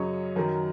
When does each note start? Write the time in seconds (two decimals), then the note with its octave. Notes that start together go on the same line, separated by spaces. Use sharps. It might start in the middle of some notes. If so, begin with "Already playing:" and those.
Already playing: F#2 C#3 F#3 C#5 D#5
0.36 F#2 D#3 F#3 A#4